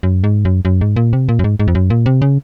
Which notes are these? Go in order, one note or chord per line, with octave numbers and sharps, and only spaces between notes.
F#2
G#2
F#2
F#2
G#2
A#2
C3
A#2
F#2
G#2
G#2
F2
F#2
A#2
C3
C#3